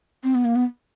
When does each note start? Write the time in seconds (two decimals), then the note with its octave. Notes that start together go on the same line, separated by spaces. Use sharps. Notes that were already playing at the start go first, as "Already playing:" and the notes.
0.24 C4
0.35 B3
0.45 A#3
0.56 B3